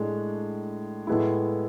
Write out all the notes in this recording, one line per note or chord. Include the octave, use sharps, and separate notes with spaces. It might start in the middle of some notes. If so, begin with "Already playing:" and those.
Already playing: A2 G#3 D4
A2 G#3 B3 E4